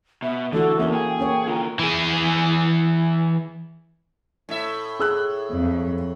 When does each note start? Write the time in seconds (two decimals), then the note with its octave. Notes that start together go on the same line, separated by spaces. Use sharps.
0.22 B2 E5
0.53 D3 E3 A3 F#4 A4
0.79 E2 A#3 C#4 A4 E5
0.93 G#4 G5
1.19 A#3 C#4 C#5
1.48 D3 F4 A#4
1.79 E3 G#4
4.49 A2 E5
5.00 G#4 E6 F#6
5.51 F2